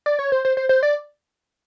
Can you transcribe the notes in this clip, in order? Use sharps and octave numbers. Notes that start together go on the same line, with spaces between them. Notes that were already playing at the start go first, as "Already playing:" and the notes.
D5
C#5
C5
C5
C5
C5
D5